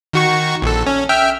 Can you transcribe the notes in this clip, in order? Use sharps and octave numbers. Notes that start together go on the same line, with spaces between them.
D#3 F#4 C#6
A#1 A4
C#4
E5 G5 F6